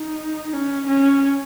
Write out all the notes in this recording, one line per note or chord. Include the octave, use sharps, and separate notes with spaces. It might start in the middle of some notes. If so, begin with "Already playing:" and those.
Already playing: D#4
C#4
C#4